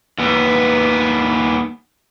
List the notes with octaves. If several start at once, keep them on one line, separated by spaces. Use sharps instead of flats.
D#2 B3